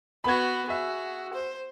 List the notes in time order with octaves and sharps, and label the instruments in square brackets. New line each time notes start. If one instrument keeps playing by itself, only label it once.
[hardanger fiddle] B3 F#4 [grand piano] B5 G#6
[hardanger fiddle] F#4 [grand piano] G#4 E5
[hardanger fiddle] C5